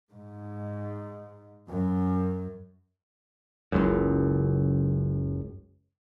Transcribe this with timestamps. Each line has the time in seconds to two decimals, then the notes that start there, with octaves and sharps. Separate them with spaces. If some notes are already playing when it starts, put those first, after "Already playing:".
0.12 G#2
1.69 F#2
3.72 F#1 C#2 F#2